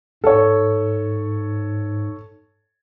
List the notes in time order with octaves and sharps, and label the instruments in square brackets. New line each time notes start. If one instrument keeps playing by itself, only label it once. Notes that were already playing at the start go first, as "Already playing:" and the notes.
[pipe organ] G#2 [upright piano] A4 C#5